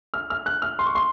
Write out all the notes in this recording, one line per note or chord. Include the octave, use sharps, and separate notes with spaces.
F6
F6
F#6
F6
C6
C#6
C6